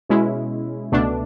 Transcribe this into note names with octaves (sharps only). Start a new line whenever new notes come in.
B2 G#3 C#4 E4
C#2 B2 A3 D4